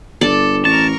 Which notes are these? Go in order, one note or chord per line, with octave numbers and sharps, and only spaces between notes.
G1 A4 D5
A1 A#4 A5 C#6